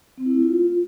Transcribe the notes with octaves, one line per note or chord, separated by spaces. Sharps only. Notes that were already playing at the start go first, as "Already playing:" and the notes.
C4
E4
A3
F4